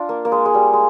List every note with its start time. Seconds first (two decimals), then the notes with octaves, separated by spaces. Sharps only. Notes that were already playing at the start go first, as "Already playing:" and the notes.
Already playing: D4 F4
0.09 A#3
0.25 A#3
0.32 G#3
0.45 G#3
0.54 G3
0.73 G#3